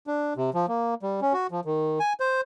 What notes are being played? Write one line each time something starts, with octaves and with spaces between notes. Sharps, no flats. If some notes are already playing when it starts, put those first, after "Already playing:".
D4
C3
F3
A#3
G3
C#4
F#4
F3
D#3
G#5
C5